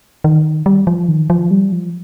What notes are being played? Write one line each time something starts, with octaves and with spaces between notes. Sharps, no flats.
D#3
G3
F3
D#3
F3
G3
F3